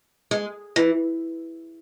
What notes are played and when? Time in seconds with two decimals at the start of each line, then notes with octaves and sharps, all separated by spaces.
0.31 G#3
0.76 E3